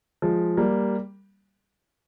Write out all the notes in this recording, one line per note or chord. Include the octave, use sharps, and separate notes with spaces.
F3 G#3
G3 A#3